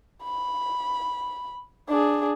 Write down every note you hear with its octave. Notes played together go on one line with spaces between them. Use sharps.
B5
D4 G#4